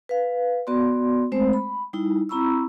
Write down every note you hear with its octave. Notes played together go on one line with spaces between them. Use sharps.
B4 F5
B3 F#4 D5 C6
G#3 A3 C4 C5
B5
G3 D#4 E4
C4 E4 A#5 B5 C#6 E6